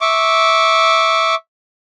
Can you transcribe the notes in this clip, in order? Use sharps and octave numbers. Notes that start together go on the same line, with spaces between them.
E5 C#6 D6